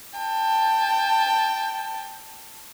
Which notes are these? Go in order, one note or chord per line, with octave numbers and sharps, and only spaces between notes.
G5 A5